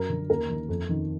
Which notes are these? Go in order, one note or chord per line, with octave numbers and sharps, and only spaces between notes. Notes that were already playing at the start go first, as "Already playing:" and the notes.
Already playing: F#2 A#4
D3
D#2 A#4
D#3
F2
D#3